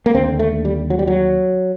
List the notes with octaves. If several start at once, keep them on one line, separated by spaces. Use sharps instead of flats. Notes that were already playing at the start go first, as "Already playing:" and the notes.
A#3
D#2 D3 C4
A3
G3
F#3
G3
F#3